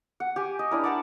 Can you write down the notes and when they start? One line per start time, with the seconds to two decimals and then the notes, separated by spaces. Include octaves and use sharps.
0.20 F#5
0.36 G4 G#5 D6
0.59 D#5
0.71 D4 E4 A#4
0.84 D5 F#5 A5 A#5